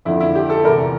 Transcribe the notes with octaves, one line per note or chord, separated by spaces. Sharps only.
F2 D3 E4
E4
G4
A4
E2 C3 E3 A#4